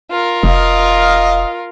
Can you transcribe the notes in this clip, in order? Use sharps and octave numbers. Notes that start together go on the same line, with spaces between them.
F4 A#4
F1 D#5 F5